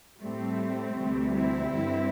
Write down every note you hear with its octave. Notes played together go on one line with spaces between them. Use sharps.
A2 G3 A3 C4
D2 C3 E3 G3
C4 E4
G2 D3 G3